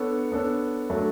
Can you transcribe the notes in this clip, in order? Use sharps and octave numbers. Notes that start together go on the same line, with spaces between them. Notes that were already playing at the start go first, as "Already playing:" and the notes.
Already playing: B3 D4 A4 C#5
B3 D4 A4 C#5
F#3 A3 D4